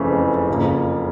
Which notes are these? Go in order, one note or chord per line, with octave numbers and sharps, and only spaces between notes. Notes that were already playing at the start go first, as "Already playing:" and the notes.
Already playing: F#1 F2 C#3 E3 A3
F#1 F2 C#3 F3 A#3